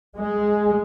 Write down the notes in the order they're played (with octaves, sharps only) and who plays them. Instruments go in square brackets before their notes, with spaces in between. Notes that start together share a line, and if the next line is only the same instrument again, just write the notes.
[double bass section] G#3